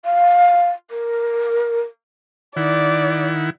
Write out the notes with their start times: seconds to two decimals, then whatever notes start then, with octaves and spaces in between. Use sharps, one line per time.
0.05 F5
0.90 A#4
2.57 D#3 E4 D5 F#5